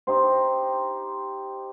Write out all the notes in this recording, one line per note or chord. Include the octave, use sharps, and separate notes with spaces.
D#4 G4 C5